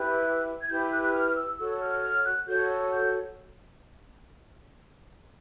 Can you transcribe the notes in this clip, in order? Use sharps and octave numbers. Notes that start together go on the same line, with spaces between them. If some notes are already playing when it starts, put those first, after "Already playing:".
Already playing: E4 G4 B4 F#6
G#6
E4 G4 B4 G6
F#6
F#6
F6
F6
E6
F#4 A4 C#5 E6
F6
F6
F#6
F#4 A4 C#5 G6
G6